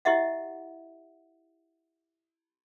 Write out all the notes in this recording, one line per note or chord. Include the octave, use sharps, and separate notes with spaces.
E4 G4 D#5 E5 F#5